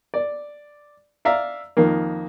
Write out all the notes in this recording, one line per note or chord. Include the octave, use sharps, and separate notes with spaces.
D5
D5 E5 F5 A#5
F2 D#3 A#3